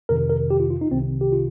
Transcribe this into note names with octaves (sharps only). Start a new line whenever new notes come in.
F2 C3 D#3 A#4
A#4
G4
F4
F4
D#4
C2 C3 D#3 C4
G4
F4